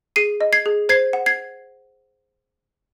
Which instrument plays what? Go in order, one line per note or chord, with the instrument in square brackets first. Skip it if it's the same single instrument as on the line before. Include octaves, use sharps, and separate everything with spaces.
[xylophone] G#4 C7 D#7
D#5
G#6 C7
G#4
C5 G#6 C7
F#5
G#6 C7